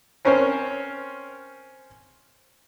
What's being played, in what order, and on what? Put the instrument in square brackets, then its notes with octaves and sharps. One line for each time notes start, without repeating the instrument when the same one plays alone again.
[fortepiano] C4 C#4 A#4 C5 C#5